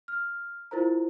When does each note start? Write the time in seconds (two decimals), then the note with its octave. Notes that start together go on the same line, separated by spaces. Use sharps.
0.08 F6
0.71 E4 F4 A#4 C5 A#5